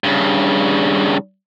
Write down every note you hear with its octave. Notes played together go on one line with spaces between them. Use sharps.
G2 C#3